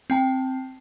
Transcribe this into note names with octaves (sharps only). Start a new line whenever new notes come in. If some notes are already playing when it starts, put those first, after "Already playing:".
C4 G5 A5